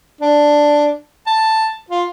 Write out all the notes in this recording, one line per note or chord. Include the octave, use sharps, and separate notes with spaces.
D4
A5
F4